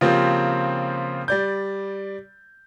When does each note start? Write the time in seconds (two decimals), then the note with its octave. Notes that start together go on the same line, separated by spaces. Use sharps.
0.01 C#3 F3 A#3 C4 F4 G4
1.28 G3 D5 G6